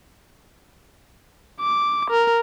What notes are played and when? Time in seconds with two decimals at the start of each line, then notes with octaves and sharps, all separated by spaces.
1.61 D6
2.10 A#4